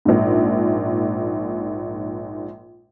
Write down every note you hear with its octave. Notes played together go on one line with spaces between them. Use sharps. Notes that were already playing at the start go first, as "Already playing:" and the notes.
A#1 G#2